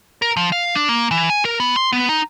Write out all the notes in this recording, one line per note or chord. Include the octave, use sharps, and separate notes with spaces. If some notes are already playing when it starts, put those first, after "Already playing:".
A#4
F3
F5
D4
A#3
E3
G#5
A#4
B3
C6
B3
D#4